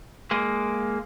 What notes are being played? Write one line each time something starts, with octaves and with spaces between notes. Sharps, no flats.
G#3 A#3